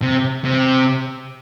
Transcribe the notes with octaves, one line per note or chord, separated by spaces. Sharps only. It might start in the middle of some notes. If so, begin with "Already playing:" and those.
C3
C3